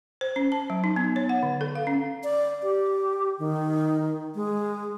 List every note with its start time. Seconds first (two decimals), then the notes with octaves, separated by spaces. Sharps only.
0.21 C5
0.36 C#4
0.52 A5
0.70 F#3
0.84 D#4
0.96 B3
1.16 C#5
1.29 F#5
1.43 D3
1.61 A4
1.75 F5
1.87 C#4
2.24 D5
2.63 G4
3.39 D#3
4.35 G#3